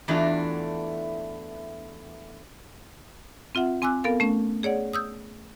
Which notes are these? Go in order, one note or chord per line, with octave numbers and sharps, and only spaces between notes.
E2 E3 A3 D4 F4 F#4
C4 F4 E5 F#5
C4 G#5 D6 E6 F#6
B3 A4 A#4 F5
A3 C#4
G#4 C#5 D5 F#5
D#6 E6 G6